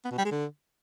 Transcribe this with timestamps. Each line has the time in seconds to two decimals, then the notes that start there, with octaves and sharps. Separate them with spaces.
0.04 B3
0.11 B2
0.18 G3
0.24 G#3
0.31 D3